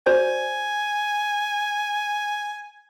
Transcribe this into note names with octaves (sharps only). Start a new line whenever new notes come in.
F#4 C5 D5 G#5